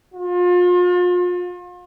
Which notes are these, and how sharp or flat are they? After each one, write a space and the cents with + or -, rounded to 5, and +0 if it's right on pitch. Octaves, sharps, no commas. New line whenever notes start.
F4 +35